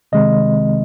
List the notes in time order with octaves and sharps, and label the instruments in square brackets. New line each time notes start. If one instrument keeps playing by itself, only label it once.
[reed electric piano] C2 C3 D#3 G#3 C4 D#5